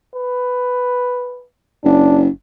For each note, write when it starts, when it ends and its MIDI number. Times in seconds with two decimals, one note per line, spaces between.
0.14 1.45 71
1.84 2.27 30
1.84 2.22 62